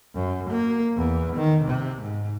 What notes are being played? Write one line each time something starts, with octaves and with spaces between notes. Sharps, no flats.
F#2
A#3
E2
D#3
C3
G#2